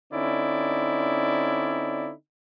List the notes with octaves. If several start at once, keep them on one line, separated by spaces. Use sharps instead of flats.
D3 C4 C#4 D#4 E4 D5